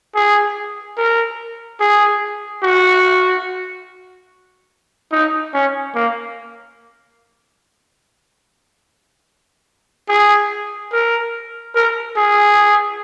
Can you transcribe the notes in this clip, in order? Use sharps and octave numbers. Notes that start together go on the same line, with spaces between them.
G#4
A#4
G#4
F#4
D#4
C#4
A#3
G#4
A#4
A#4
G#4